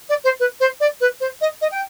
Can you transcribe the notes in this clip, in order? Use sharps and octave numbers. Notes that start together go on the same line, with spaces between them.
D5
C5
B4
C5
D5
B4
C5
D#5
D#5
G5